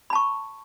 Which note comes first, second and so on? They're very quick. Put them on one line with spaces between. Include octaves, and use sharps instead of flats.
B5 A5 C#6